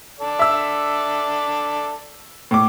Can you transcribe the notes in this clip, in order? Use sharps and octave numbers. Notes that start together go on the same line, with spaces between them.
A4 D5
E5 E6
A2 D6